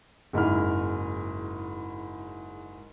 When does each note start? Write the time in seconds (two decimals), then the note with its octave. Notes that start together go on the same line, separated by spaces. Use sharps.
0.33 F#1 G#2 E4 F6